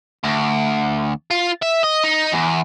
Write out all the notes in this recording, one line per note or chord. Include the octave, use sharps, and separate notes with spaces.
D2
F4
E5
D#5
D#4
E2